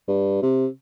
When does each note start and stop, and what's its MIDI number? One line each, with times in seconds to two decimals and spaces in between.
0.08 0.39 43
0.42 0.66 48